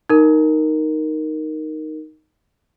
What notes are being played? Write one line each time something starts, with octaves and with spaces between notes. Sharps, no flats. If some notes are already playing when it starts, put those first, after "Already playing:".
D#4 A#4